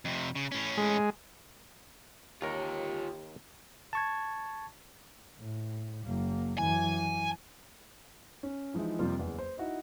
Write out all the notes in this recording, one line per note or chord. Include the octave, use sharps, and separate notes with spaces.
F2 C3
C#3
A2 C#4
G#3
D#2 F4 G4 A#4 C#5
A5 C#6 G#6
A2
F#1 A#3
F#2 E3 G#5
C#4
E3 F3 G#3 D#4 E4
F2 C3 F3 G3 A#3 F4
F#1 E2
C5
D#4 E4 F#4 D#5